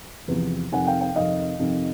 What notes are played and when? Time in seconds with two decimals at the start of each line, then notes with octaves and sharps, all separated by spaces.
0.28 E2 C3 F3
0.72 F2 C3 D#3 F#5 G#5
0.86 F5 G5
1.00 F5 G5
1.15 F2 C3 D#3 D#5 F5
1.59 F2 C3 D#3